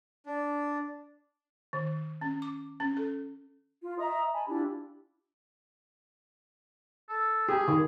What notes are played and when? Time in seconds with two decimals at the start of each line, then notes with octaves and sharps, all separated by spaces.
0.26 D4
1.73 D#3
2.21 C#4
2.42 D6
2.80 C#4
2.97 A4
3.82 F4
3.99 D#5 E5 A#5 D#6
4.32 G#5 A5 B5
4.48 D4 E4 F4 G4
7.09 A4
7.49 G4 G#4
7.68 D#3